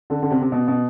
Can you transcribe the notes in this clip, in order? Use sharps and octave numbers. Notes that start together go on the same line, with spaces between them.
D3
D3
C3
C3
B2
B2